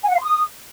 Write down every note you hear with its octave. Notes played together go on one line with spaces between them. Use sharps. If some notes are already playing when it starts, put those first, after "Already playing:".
G#5
F#5
F5
C6
D#6